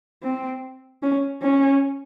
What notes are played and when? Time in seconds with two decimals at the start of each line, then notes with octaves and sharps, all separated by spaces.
0.23 C4
1.02 C#4
1.42 C#4